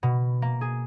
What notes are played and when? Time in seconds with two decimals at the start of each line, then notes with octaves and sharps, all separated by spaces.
0.03 B2
0.42 A#3
0.61 G#4